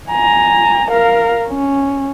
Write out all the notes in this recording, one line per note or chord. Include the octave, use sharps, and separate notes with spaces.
G#5 A#5
A#4 F5
C#4